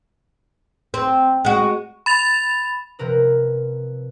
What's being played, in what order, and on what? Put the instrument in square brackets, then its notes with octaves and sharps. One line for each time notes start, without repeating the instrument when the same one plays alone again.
[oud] C4
G#3 F#4
[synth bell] B5 A6 F7
[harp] C3 F3 A#4 B4